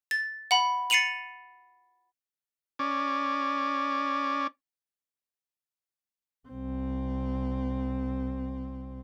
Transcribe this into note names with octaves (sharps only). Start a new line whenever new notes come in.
A6
F#5 B5
A6 C7 C#7 D#7 F7 F#7
C#4 D5
C2 C4